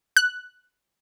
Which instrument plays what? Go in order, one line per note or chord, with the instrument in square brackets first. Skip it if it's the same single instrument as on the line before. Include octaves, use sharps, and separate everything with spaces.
[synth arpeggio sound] F#6